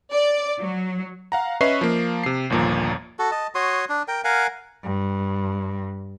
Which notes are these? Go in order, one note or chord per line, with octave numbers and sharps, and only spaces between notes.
D5
F#3
F5 F#5 A#5
C#4 B4 D#5 E5 C#6 C7
F3 A#3
C3 C7
G1 D#2 A#2 F3 A#5
F#4 A4
D#5 A5
F#4 C#5 C6 D#6
D4
A#4 G5
A#4 F5 F#5 G#5
G2